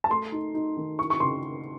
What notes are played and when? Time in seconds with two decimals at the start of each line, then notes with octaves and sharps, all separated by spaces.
0.04 A5
0.10 A3 C6
0.32 D#4
0.54 D#4
0.77 D#3
0.98 E4 C#6
1.10 C#6
1.20 C#3 C6